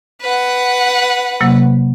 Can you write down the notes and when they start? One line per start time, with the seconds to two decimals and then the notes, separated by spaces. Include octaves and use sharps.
0.21 B4 F#5
1.41 C3 F#3 A#3